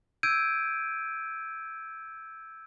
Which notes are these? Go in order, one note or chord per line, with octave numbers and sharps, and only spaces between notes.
E6 G6 G#6 D7 D#7